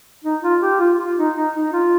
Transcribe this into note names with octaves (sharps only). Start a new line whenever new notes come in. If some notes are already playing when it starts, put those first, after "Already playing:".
D#4
F4
G4
F4
F4
D#4
D#4
D#4
F4